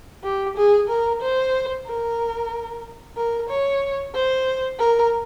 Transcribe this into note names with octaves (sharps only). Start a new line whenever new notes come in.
G4
G#4
A#4
C5
A#4
A#4
C#5
C5
A#4